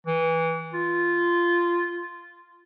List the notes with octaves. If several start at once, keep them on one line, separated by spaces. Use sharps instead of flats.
E3
F4